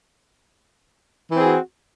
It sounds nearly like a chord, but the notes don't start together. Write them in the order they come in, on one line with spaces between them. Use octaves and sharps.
E3 C4 G#4 F#4